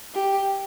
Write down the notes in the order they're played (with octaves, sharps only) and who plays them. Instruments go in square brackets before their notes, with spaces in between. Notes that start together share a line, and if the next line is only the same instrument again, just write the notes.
[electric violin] G4